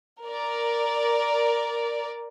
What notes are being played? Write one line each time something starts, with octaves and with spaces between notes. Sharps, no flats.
A#4 D5